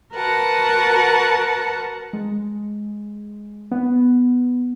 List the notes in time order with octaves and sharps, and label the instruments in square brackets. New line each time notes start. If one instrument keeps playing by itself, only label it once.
[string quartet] F#4 A#4 B4 F#5 A5
[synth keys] G#3
B3